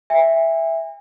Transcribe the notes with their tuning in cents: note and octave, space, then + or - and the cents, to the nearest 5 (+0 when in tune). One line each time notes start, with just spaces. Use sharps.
E5 +0 G#5 -45